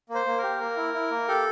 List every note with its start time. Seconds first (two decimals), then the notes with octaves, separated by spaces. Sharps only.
0.09 A#3
0.14 C5
0.26 A#3
0.38 A#4
0.43 G4
0.60 A#3
0.76 E4
0.94 E4
1.11 A#3
1.28 G4 A4